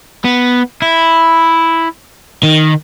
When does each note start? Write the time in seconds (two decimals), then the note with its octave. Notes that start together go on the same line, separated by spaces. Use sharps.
0.25 B3
0.82 E4
2.43 D#3